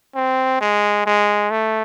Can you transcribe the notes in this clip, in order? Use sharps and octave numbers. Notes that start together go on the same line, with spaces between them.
C4
G#3
G#3
A3